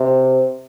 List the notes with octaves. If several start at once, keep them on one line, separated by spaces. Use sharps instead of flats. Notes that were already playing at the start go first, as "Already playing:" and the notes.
Already playing: C3